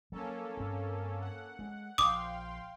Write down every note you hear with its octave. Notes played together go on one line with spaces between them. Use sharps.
F#3 A#3 C#4 A4
G2 C4
F#5
G#3
A#1 F5 G5 C6 D6 D#6